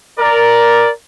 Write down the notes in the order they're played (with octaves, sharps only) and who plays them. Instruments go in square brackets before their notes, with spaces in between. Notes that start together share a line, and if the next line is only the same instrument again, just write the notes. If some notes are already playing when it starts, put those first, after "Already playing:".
[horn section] A#4 D5